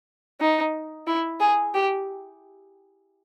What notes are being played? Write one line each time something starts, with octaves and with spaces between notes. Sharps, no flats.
D#4
E4
G#4
G4